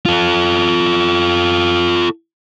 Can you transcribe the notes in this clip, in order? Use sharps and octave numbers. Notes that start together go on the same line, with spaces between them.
F4 A4